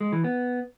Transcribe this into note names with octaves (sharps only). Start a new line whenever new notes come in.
G#3
E3
B3